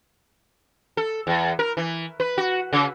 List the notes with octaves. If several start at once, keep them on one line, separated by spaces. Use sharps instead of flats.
A4
E2
A#4
E3
B4
F#4
C#3